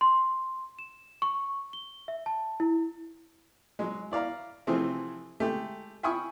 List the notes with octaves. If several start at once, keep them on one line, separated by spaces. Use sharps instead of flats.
C6
E7
C#6
G7
E5
A5
E4
F#3 G#3
E4 D5 F5 A#5
C3 E3 F3 A3 C4 G#4
G#3 A3 G4
E5 G5 G#5 B5 C#6 D#6